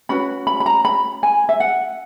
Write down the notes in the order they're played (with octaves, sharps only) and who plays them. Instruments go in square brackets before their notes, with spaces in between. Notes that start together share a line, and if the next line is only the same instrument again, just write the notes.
[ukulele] C#4 F#4 B4 B5
B5
B5
A#5
B5
G#5
E5
F#5